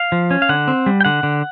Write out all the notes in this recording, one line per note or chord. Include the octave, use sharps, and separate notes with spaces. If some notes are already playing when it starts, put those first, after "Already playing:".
Already playing: F5
F3
C#4
F5
D3 F#5
C4
G3
G5
D3 F#5
D3